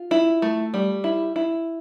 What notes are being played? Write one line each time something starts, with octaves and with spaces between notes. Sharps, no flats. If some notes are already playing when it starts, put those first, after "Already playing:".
Already playing: F4
E4
A3
G3
E4
E4